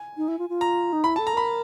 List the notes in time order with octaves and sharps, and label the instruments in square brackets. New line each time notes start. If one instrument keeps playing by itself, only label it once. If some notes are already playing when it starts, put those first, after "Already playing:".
Already playing: [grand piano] G#5
[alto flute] D#4
E4
F4
F4
[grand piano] A#5
[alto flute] D#4
[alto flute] E4 [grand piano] B5
[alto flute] A4 [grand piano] A5
[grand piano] A#5
[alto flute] A#4 [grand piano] B5